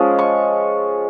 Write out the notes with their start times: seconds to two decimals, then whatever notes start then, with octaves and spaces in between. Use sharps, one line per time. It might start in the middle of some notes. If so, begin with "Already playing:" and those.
Already playing: F3 G#3 C#4
0.19 C#6